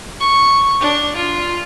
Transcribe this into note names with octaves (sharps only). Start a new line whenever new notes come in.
C#6
D4
F4